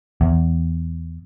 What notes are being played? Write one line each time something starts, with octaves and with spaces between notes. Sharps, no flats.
E2